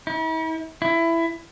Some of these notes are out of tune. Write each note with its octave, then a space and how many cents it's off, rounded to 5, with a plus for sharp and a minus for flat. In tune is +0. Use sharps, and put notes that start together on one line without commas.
E4 -45
E4 +15